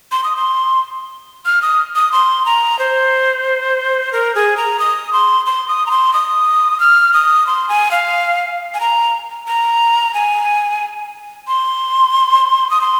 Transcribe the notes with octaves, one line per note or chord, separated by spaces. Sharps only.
C6
D#6
C6
F6
D#6
D#6
C6
A#5
C5
A#4
G#4
A#5
D#6
C6
C6
D#6
A#5
C6
D#6
F6
D#6
C6
G#5
F5
G#5
A#5
A#5
G#5
C6
D#6
C6